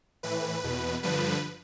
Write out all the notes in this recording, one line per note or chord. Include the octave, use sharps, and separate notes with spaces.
A2 E3 B4
E2 B2
G2 D3 F3 B4